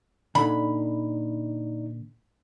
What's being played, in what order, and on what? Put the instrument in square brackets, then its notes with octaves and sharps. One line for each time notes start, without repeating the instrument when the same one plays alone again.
[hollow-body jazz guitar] A#2 D3 [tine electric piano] D#4 D5 [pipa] B5